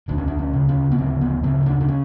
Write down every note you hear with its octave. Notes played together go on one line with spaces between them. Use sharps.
D2 D4
C#4
D4
C#4
C#3
C#4
B3
D2 C4
B3
C#3 C4
D4
D4
C#4